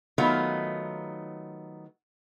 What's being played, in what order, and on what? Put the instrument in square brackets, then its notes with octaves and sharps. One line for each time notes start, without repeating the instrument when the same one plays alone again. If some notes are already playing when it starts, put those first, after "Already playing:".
[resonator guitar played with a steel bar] D#3 F#3 A3 B3 D#4 F4